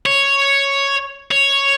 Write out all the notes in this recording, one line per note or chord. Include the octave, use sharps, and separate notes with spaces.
C#5
C#5